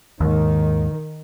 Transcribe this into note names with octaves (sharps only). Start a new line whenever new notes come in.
D#2 G#2 D#3